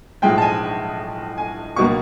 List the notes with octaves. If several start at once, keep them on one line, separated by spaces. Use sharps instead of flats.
B1 A2 F3 G#3 G5
A5
G#5
G#5
C#2 B2 F#3 A#3 C#6